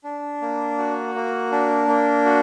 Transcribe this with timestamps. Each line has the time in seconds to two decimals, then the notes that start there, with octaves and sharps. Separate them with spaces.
0.04 D4
0.42 A#3
0.78 F#4
1.15 A#3
1.52 D4
1.88 A#3
2.26 F#4